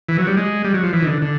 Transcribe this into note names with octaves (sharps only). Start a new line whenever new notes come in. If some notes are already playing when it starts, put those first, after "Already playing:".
E3
F#3
G3
G#3
G3
F#3
F3
E3
D#3
D3
D3